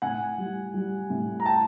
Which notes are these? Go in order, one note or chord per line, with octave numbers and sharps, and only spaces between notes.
A2 F#5 G#5
G3
G3
A2
A#5
G5 A5